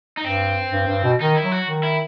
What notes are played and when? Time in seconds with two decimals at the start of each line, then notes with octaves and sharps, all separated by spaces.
0.17 D#4
0.24 G2 C4
0.73 G2
0.88 G2
1.04 B2
1.21 D#3 D#4
1.36 E4
1.43 F#3
1.52 F#4
1.67 D#3
1.83 E4